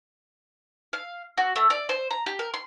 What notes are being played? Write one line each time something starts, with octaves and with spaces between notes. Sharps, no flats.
F5
F#4
A3
D5
C5
A#5
G4
A#4
C6